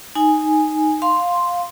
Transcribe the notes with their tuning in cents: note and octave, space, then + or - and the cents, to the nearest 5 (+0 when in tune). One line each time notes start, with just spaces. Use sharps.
D#4 +0 G#5 +0
F5 +10 C6 +0